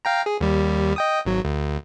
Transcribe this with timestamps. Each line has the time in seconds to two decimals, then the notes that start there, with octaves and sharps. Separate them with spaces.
0.05 F5 G5 A#5
0.26 G#4
0.41 D#2 G3
0.96 D#5 G5 D#6
1.25 G#1 F#3
1.45 D2